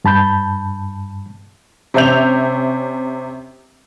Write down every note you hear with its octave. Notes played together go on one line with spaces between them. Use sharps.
G2 A5 B5 G6
C3 C#4 E5 G6 F7